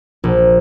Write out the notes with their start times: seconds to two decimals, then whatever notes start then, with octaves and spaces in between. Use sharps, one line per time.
0.24 A#1